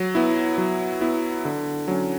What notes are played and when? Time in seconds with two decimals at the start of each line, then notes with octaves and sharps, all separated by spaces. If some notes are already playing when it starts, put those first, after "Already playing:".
Already playing: F#3
0.15 B3 E4
0.58 F#3
1.01 B3 E4
1.45 D3
1.88 F#3 C#4